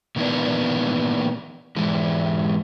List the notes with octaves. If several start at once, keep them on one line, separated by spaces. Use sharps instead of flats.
A#2 D#3 E3 A#3 B3 D4
G#2 E3 G#3